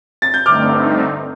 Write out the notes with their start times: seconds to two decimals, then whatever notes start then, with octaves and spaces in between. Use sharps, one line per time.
0.22 A6
0.34 G6
0.46 G2 D3 A3 C4 D#4 D6 F6